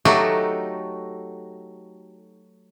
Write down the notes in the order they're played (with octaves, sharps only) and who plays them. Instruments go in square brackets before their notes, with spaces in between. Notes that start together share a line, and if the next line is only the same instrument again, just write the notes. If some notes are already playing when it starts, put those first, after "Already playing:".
[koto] F#3 A3 D#4 F#4 G4 A4